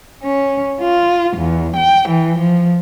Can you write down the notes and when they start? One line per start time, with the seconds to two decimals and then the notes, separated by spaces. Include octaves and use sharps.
0.24 C#4
0.81 F4
1.38 E2
1.76 G5
2.09 E3
2.39 F3